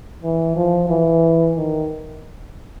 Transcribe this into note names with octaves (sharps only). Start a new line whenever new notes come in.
E3
F3
E3
D#3